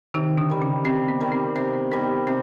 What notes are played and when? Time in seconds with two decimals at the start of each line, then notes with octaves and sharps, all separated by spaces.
0.14 C3 D#3 D#4
0.38 D3 D4
0.50 D#3 G3
0.61 C#3 C#4
0.84 C3 C4
1.08 B3
1.20 D#3 G3
1.32 C4
1.56 C3 C4
1.73 B3
1.91 D#3 G3 B3
2.27 C3 C4